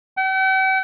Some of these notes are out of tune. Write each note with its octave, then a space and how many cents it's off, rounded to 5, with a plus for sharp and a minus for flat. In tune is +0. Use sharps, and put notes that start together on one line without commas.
G5 -45